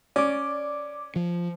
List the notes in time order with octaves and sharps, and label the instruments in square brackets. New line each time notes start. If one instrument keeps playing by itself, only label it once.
[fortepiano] C#4 [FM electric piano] D5 D6
[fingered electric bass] F3